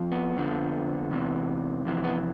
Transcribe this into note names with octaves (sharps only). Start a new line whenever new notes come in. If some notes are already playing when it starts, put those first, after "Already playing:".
Already playing: F2 F3
B3
F2 D3 F3
E2 C3 E3
F2 C3 E3
B3